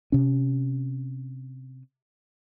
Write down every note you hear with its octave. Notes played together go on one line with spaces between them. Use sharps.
C3 C#4